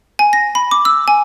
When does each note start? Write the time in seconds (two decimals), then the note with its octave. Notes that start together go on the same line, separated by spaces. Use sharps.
0.19 G#5
0.33 A#6
0.55 B5
0.71 D6
0.85 E6
1.08 G#5